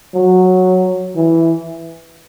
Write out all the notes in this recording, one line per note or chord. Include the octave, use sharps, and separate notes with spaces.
F#3
E3